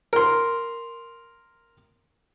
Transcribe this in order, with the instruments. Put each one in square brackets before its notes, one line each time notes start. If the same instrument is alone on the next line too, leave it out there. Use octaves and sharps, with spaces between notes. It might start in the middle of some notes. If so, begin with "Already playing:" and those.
[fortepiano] A#4 C6